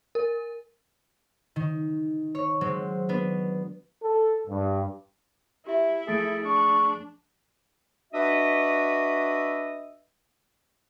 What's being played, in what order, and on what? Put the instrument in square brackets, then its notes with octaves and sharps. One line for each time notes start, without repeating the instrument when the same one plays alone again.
[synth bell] A#4
[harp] D#3
C#5
F#3 G#3 C4
B3 D4
[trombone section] A4
G2
[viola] E4 [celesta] G4 E5
[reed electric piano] F3 A3 G#4 [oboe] A4 [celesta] D#6 A6 D7
[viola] D4 [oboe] C#6
[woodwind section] D4 F#4 B4 D#5 E5